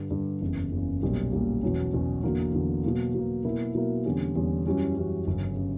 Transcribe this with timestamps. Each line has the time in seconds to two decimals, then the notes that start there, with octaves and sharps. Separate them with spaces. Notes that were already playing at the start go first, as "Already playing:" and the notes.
Already playing: G2 D3 G3
0.11 G2 D3 G3
0.41 F#1 E2 C#3
0.72 F#1 E2 C#3
1.02 B1 A#2 G3 A#3
1.32 B1 A#2 G3 A#3
1.62 E2 B2 F#3 C#4
1.93 E2 B2 F#3 C#4
2.23 E2 D3 F#3 A#3
2.53 E2 D3 F#3 A#3
2.83 B2 F#3 A#3
3.15 B2 F#3 A#3
3.44 B2 F#3 A#3 E4 A#4
3.75 B2 F#3 A#3 E4 A#4
4.05 E2 D3 G3 C#4
4.36 E2 D3 G3 C#4
4.65 F#2 E3 G3 C#4 F#4
4.97 F#2 E3 G3 C#4 F#4
5.27 G1 F#2 C#3
5.56 C#3